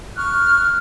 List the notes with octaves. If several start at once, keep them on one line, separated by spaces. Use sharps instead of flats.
C#6 F6 F#6